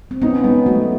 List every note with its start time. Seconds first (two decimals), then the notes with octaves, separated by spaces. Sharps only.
0.11 C4
0.22 B3 C#4 D#4
0.44 G#3 B3
0.66 F#3 A3